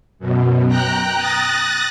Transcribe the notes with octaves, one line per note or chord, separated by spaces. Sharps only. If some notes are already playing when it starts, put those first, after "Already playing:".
F#2 B2
G5 A#5 F#6
D#6 F#6 A6 A#6